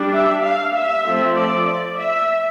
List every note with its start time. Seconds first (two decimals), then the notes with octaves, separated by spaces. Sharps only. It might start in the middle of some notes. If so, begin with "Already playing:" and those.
Already playing: G3 D4
0.13 E5
0.43 F5
0.74 E5
1.05 F3 A3 C4
1.35 D5
1.65 D5
1.96 E5